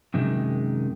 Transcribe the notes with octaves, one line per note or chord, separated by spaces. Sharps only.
F#2 C3 D#3 G#3